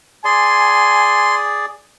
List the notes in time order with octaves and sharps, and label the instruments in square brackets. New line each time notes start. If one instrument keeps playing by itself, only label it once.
[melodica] G#4 D5 [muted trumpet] G#5 [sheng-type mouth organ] C6